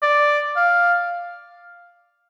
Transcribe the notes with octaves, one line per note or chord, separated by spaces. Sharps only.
D5
F5